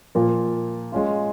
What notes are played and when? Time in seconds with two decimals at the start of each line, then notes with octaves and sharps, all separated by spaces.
0.15 A#2 F3 A#3 F4
0.92 G#3 C#4 F4